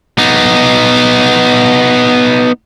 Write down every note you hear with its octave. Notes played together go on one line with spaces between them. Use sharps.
B3 D#4